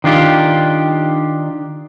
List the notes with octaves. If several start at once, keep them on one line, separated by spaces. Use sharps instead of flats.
D#3 D4 F4 G4